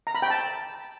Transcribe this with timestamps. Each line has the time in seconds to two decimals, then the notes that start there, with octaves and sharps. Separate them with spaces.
0.07 A#5
0.15 B5
0.22 G5
0.30 A5